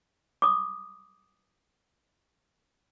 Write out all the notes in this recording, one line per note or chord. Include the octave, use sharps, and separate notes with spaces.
D6 D#6